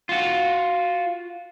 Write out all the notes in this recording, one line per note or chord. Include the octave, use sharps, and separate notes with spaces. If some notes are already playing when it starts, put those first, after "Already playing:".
F4 F#4